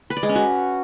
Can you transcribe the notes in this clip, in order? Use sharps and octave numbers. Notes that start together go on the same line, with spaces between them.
B4
D5
G#3
C#4
F#4